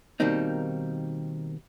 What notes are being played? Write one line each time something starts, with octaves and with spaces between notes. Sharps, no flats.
B2 D#3 G3 A#3 C4 D#4